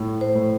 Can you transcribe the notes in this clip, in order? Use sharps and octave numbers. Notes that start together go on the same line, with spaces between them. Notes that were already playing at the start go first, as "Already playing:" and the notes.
Already playing: A2
C5
A2